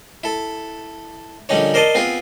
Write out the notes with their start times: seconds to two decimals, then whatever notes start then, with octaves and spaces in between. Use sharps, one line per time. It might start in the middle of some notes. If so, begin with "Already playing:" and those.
0.24 E4 A4
1.49 A#1 D3 G3 C#4 D#4 C#5
1.74 A#4 C5 D5 D#5 A5
1.95 B3 C4 F4 G#4